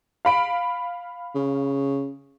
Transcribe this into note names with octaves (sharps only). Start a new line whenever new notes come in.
F5 B5 D7
C#3